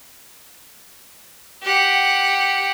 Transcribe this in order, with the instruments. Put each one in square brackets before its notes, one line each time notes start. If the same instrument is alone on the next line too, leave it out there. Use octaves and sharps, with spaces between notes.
[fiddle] G4 F#5